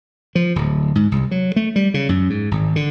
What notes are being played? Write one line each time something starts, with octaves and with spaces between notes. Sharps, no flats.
F3
D1
G#2
C2
F#3
A3
G3
C#3
F#2
G#2
G#1
D3